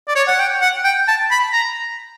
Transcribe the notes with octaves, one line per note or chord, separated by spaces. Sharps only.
D5
C#5
F#5
G5
F#5
G5
A5
B5
A#5